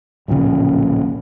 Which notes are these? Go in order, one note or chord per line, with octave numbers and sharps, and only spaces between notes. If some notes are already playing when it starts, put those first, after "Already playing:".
D1 A#1 A#2 C#3